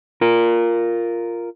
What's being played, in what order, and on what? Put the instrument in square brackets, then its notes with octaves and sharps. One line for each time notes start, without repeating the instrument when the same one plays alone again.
[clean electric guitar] F4 A#4